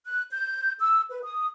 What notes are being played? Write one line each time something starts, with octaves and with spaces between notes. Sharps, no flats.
F#6
G6
E6
B4
D#6